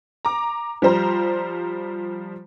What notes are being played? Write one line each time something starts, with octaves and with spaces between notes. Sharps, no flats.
A#5 D6
F3 G3 C5 A#5